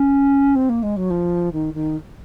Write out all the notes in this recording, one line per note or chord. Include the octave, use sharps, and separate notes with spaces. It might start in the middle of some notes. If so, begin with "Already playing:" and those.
Already playing: C#4
C4
A#3
G#3
F#3
F3
D#3
D#3